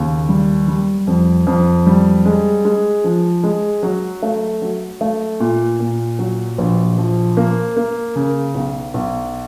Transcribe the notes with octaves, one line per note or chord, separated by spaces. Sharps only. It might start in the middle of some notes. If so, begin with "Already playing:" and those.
Already playing: D#2 C#3
G3
G3
F2
F2
G3
G#3
G#3
F3
G#3
F#3
A3
F#3
A3
A#2
A#2
F#3
A#1
F3
A#3
A#3
C#3
B1
B1